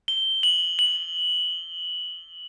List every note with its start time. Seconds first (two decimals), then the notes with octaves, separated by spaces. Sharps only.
0.08 G7
0.43 F#7
0.79 F#7